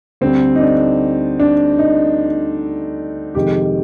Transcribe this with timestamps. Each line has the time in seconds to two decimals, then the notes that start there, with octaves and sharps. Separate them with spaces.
0.21 D2 D3 G3 C4
0.55 D#4
0.61 D4
1.40 D4
1.78 D#4
3.35 F2 C3 D#3 G#3 G4